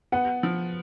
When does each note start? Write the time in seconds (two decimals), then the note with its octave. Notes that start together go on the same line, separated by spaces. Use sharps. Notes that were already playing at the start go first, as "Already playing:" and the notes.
0.12 B3 F#5
0.43 F3